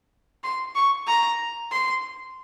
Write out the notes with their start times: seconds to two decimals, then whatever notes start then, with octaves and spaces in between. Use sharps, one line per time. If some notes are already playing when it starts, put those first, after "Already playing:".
0.44 C6
0.75 C#6
1.07 A#5
1.71 C6